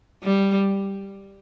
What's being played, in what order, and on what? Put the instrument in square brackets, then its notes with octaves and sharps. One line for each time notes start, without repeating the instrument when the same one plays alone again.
[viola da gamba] G3